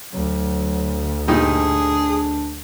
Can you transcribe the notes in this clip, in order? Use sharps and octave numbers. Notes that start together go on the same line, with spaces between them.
D2 F#3
G2 A#2 D4 D#4 G#4